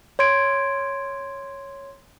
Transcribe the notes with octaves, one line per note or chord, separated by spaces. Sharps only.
C#5 C6 G#6 D7